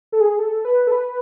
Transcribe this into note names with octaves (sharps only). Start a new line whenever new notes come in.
A4
G#4
A4
B4
A4
B4